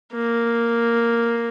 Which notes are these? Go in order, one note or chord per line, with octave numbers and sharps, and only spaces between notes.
A#3